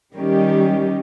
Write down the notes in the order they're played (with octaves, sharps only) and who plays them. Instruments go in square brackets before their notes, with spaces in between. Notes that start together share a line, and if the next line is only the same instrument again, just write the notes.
[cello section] D#3 G3 C#4 G4